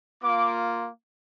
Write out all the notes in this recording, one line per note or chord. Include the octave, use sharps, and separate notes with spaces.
A#3 F4 D6